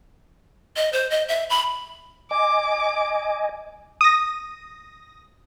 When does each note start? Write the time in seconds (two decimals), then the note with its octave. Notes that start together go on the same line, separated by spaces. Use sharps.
0.76 D#5
0.93 C5
1.11 D#5
1.29 E5
1.50 B5
2.31 D#5 G#5 D6
4.01 D#6 A#6